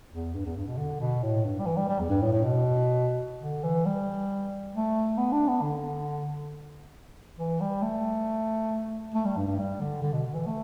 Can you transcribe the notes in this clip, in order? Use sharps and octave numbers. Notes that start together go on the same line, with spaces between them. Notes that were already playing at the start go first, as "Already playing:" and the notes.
E2
G2
E2
G2
B2
D3
B2
A2
G2
G3
E3
G3
G3
E2
G2
A2
A2
B2
D3
E3
G3
A3
B3
D4
B3
D3
E3
G3
A3
A3
G3
G2
G2
G3
D3
D3
B2
D3
E3
A3